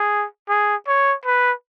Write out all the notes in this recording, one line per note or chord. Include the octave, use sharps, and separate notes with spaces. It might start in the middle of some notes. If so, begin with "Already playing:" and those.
Already playing: G#4
G#4
C#5
B4